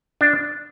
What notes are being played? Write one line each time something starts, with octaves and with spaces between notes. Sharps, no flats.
D4